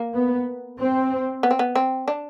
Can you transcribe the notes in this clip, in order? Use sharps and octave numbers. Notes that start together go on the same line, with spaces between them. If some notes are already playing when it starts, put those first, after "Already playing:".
Already playing: A#3
B3
C4
B3
C4
B3
C4
D4